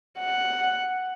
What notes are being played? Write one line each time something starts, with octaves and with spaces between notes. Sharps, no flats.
F#5